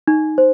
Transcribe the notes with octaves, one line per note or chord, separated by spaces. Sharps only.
D#4
C5